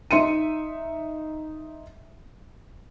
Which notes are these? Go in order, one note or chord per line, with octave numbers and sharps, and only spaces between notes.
D#4 E5 C6 C#7 D#7